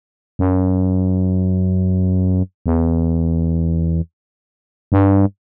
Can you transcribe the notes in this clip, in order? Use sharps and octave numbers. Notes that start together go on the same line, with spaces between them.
F#2
E2
G2